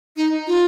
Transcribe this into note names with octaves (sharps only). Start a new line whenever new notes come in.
D#4
F4